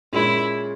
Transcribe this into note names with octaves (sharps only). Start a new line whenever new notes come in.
A#2 G#3 C#4 E4